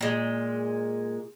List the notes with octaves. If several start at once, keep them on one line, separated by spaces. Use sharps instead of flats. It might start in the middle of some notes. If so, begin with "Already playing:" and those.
A#2 G#3